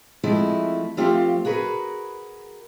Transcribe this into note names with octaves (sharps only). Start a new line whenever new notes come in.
F3 G#3 A3 C4 E4
F3 A3 C4 F4 G4
F#4 G#4 A#4 B4